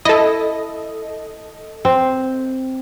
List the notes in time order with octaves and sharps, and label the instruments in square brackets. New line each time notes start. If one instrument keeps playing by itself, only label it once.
[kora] E4 [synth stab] A4 D#5
[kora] C4